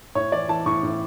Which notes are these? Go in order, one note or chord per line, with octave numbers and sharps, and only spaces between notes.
A2 C#5
E3 D5
E3 A5
A2 C#6
A2